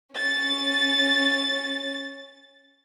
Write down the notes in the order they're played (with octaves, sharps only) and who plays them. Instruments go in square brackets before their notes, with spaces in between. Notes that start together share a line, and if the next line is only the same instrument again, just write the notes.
[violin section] C#4 A6